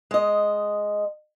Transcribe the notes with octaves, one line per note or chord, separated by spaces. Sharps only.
G#3 D#5